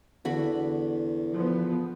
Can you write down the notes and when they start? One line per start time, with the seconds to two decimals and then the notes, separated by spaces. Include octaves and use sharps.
0.25 E2 D3 F#4 B5
1.32 F3 B3